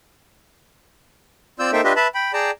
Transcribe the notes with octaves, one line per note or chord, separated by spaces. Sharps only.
C4 F4 D5 E6 G6
A#3 D#4 A4 C5 E5 G5
D4 F4 G4 B4 D#5 E5
B4 E5 A5 B5
G5 B5
G#4 D5 G5 A5 A#5